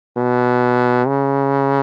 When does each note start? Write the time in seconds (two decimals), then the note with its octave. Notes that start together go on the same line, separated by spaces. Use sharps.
0.17 B2
1.07 C#3